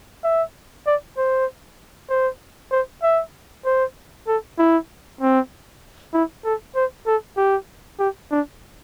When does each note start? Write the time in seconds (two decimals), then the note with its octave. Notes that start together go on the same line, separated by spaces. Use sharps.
0.24 E5
0.86 D5
1.17 C5
2.09 C5
2.71 C5
3.03 E5
3.66 C5
4.27 A4
4.58 E4
5.21 C4
6.14 E4
6.45 A4
6.75 C5
7.06 A4
7.37 G4
7.99 G4
8.31 D4